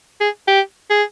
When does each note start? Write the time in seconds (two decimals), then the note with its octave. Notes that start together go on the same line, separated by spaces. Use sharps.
0.20 G#4
0.48 G4
0.90 G#4